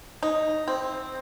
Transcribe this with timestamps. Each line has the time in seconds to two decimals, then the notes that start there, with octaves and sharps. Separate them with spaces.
0.23 D#4
0.68 C4